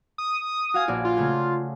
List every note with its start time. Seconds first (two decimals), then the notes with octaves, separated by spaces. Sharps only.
0.18 D#6
0.74 F#4 F5 G#5
0.88 A#1 F#4 D5
1.04 F4
1.17 C#3 A3 G#4